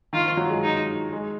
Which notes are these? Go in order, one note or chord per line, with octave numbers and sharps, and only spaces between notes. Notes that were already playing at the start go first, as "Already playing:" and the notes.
D#3 F4
F3
F#3
G#3
D#4
G#3